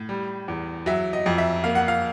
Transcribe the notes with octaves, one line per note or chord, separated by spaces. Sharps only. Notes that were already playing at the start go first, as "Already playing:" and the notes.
Already playing: A2
G3
E2
F#3 E5
D#5
F2
E5
A#3 F5
F#5
F5